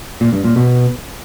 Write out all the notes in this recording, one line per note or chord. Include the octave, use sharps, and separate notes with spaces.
A#2
G2
A#2
B2